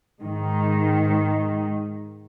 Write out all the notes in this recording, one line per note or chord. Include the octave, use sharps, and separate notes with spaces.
G#2 D#3